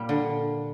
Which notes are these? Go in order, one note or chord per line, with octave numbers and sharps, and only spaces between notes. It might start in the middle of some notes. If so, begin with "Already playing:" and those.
Already playing: A#2 G3 A#3
D3